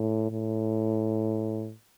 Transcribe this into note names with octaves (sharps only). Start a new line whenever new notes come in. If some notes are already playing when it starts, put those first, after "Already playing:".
Already playing: A2
A2